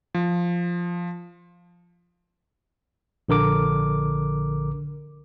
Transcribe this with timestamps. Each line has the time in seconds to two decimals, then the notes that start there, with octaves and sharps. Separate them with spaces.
0.14 F3
3.29 A#1 D3 A#4 D6